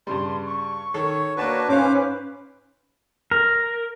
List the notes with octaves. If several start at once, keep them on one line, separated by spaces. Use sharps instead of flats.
G2 C#3 G3 C6
C#6
D#3 A4 C#5
A#3 D4 F#4 B4 C#5 A5 C#6
G#2 C#4 B4 C5 F5 D6
A#4